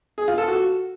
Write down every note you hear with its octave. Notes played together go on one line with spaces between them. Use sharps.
G#4
F4
A4
F#4